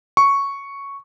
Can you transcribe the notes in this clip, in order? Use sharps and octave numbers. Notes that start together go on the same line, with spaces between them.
C#6